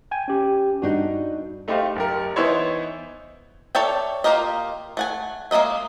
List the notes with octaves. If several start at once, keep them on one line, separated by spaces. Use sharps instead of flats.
G5 G#5
C#4 G4
G2 D4 D#4 F#4
A3 D#4 G4 C5 D#5 F5
F#1 G4 A#4
E3 B3 D#4 E4 C5 C#5
A4 C#5 D5 E5 G5
A#3 F4 G4 A#4 D#5
A3 F#5 G#5
G#3 A#3 B4 D#5 E5